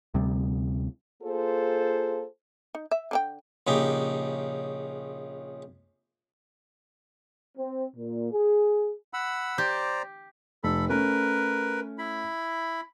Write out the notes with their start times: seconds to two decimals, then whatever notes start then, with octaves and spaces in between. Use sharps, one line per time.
0.14 D2 C3 G3
1.21 A#3 F4 G#4 A4 C5
2.75 D#4
2.91 E5
3.11 D3 D4 G5
3.67 A#1 C#3 D#4 G4
7.57 C4
7.95 A#2
8.31 G#4
9.13 F#5 B5 E6
9.58 G4 C5 D5 A#5
10.64 F1 A4 B5
10.89 A3 C#4 A#4 B4
11.98 E4 B5